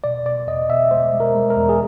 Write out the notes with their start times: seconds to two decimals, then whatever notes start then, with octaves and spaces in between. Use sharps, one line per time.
0.04 B2 D5
0.25 B2 D5
0.47 E2 D#5
0.69 B2 E5
0.91 G#3 C5
1.13 G#3
1.20 A#4
1.35 G#3
1.50 A#4
1.56 E2
1.69 G#4